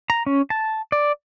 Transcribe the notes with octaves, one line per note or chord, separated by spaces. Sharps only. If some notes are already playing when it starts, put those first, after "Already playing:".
A#5
C#4
A5
D5